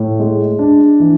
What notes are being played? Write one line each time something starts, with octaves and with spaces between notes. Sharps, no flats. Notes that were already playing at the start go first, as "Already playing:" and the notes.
Already playing: A2
G#3
D4
E3